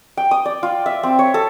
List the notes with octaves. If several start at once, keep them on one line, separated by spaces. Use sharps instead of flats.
G5
D#6
D5
F4
E5
C4
C#5
A4